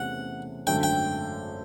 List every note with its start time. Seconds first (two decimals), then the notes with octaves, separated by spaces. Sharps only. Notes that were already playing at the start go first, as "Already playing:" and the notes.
Already playing: E2 C3 E3 A3 C#4 F#5
0.67 G#1 F#2 D3 F#3 A3 G5
0.83 G5